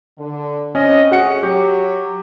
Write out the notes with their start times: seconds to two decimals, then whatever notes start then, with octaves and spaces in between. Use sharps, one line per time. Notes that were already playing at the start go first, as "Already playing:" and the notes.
0.18 D3
0.75 D3 C4 C#4 D#5
1.11 A3 C#4 F#4 G#4 F#5 C#7
1.43 F#3 G4